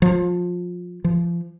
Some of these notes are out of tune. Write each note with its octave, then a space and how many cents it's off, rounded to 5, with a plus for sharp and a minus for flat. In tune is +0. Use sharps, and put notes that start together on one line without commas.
F3 +20
F3 -30